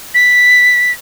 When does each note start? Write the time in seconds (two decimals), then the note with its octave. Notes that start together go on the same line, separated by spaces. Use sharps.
0.14 B6